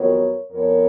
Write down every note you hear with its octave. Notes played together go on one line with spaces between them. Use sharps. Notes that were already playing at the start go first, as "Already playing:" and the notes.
Already playing: F2 D#3 F#3 B3 A#4 C#5
F2 F3 B3 A#4 C#5